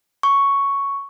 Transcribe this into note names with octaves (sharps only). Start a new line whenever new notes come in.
C#6